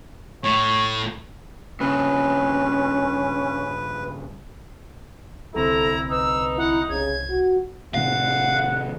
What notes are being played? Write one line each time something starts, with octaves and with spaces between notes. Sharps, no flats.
A2 C#5
G2 C#3 C#4 B4
C2 D3 C4 E4 A4 A#5
D#4 B4 E6
E4 F#5
C2 C#3 G#6
F#4
A2 C3 D#3 F5 F#5